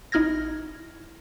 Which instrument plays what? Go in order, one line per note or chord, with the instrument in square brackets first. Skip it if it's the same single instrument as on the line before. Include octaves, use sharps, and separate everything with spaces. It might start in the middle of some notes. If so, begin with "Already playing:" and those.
[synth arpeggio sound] A1 D#4 E4 F6 G#6 A#6